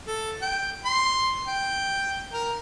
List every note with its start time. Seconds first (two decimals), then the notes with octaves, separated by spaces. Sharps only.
0.07 A4
0.42 G5
0.85 C6
1.48 G5
2.33 A#4